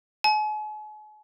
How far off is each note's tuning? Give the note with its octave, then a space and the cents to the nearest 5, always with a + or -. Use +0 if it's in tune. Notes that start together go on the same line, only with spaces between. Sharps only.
G#5 +45